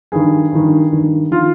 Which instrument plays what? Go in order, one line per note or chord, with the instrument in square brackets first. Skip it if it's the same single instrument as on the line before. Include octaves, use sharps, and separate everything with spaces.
[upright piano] G2 D#3 G#4
G2 D#3
G2 D#3
D#3 F4